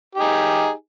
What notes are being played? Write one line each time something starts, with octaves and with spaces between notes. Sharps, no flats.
D#4 G4 G#4